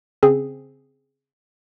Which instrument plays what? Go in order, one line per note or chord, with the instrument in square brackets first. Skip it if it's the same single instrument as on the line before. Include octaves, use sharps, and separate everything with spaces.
[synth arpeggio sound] C#3 C4 G#4